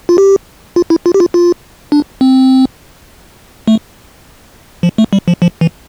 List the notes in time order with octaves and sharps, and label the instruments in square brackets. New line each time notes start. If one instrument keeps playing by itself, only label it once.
[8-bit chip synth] F4
G4
F4
E4
F4
G4
F4
F4
D4
C4
A3
F3
A3
G3
F3
F3
E3